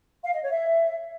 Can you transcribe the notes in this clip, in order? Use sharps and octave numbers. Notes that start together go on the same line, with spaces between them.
F5
D#5
C#5
E5